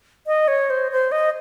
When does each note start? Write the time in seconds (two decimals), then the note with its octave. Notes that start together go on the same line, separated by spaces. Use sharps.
0.27 D#5
0.48 C#5
0.70 C5
0.92 C5
1.12 D#5